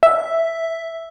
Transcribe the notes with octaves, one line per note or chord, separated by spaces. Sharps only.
E5